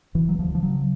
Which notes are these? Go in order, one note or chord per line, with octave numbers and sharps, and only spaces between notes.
E1 E3
F#3
D2 F3
F3
C#3 F#3